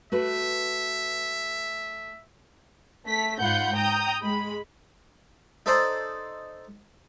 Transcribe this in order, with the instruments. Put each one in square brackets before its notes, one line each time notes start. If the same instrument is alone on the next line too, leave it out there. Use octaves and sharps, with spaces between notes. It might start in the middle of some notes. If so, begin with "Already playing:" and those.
[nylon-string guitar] A3 F#4 B4 [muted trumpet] E5
[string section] A3 B6
G#2 F4 F#5 B5 G6
G5 A#5 D#6 G6
G#3 B5
[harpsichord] D#4 A4 C5 D5 D#5 A#5